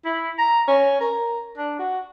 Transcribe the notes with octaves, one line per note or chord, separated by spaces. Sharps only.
E4
A#5
C#4
A#4
D4
F#4